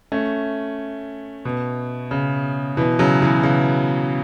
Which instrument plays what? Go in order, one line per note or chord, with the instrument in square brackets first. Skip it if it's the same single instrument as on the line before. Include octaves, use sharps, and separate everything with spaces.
[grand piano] A3 C#4
B2
C#3
B2 E3
C#3 F#3
B2 E3
C#3